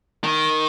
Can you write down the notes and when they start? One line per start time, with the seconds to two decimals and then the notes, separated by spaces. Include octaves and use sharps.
0.24 D#3